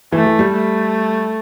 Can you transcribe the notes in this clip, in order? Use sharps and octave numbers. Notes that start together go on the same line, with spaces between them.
E3 A3
E3
G3
A3